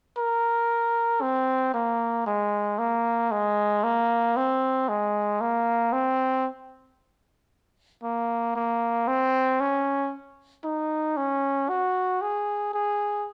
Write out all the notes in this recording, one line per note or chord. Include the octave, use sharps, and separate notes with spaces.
A#4
C4
A#3
G#3
A#3
G#3
A#3
C4
G#3
A#3
C4
A#3
A#3
C4
C#4
D#4
C#4
F#4
G#4
G#4